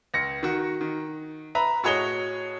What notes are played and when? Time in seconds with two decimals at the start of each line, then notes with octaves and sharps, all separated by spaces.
0.14 C#2 A#6 C#7
0.43 D#3 F#4
0.81 D#3
1.55 B4 E5 A#5 B5
1.83 A2 F#4 G#4 C#5 D#5 G7